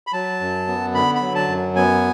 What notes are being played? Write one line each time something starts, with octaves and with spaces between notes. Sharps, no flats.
B5
F#3 A5
F#2
B3
D3 B5
B5
F#3
A5
F#2
B3 G#5